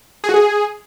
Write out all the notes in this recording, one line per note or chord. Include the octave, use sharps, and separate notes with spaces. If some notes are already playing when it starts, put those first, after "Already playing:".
G#4
F#4
G#4